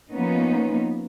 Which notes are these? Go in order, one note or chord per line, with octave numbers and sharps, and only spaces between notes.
F3 A#3 B3 C#4 D#4